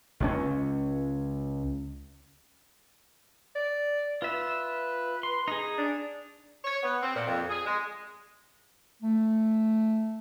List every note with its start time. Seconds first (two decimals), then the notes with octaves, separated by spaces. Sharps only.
0.20 C#2 F3 C#4
3.55 D5
4.22 F4 B4 E5
5.23 C6
5.48 D#4 G#4
5.78 D4
6.64 C#5
6.82 B3
7.01 C4
7.16 A#2
7.27 F2
7.50 G#4
7.65 G#3
9.02 A3